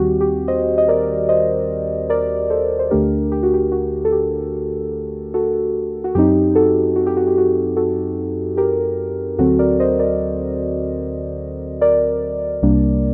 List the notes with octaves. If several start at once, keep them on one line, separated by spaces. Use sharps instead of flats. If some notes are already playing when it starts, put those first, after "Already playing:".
Already playing: D#2 D#3 G3 C4 F#4 G4
G4
C5 D#5
D#5
A#4 D5
C5 D#5
A#4 D5
A4 C5
C5
D2 D3 A3 D4 G4 A#4
G4
F#4
G4
F#4
A4
G4
F#4 A4
F#4
F#2 F#3 C4 D#4 G4
F#4 A4
F#4
G4
F#4
G4
F#4
F#4 A4
G4 A#4
D2 D3 F#3 C4 F#4 A4
A#4 D5
C5 D#5
A#4 D5
A#4 D5
C2 C3 G3 A#3 D4